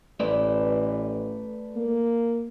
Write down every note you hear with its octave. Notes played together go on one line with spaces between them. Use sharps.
A1 A3 B4 D5
A#3